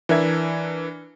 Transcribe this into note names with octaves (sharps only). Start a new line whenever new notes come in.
E3 D4 A#4 E5 G#6